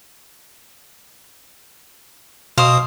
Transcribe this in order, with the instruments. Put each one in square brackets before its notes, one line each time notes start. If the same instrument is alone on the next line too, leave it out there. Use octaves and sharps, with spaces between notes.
[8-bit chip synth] B2 D#6 [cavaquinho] C5 F5